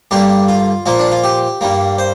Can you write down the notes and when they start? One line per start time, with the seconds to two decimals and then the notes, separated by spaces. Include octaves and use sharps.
0.11 G2 D3 G3 A#3 G4
0.48 F4
0.86 A#2 F3 A#3 F4
0.99 D4
1.11 F4
1.24 G4
1.61 G2 G3 A#3
1.98 C5